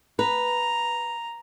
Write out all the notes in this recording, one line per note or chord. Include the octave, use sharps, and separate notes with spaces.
B4 A#5